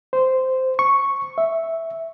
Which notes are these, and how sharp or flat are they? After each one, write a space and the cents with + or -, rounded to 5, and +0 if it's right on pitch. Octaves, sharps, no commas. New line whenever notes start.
C5 -10
C#6 -5
E5 -5